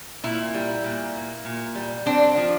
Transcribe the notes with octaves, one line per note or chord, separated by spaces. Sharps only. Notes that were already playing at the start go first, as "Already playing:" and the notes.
A#2 E4
G3
A#2
A#3
A#2
G3
C4 D4
F3